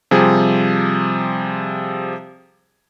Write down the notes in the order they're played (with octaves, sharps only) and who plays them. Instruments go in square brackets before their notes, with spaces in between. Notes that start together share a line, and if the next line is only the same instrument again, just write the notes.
[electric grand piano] C3 F3 G3 G#4